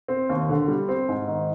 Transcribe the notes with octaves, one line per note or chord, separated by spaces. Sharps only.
C4
D#2
D3
G3
C4
G#2
D#3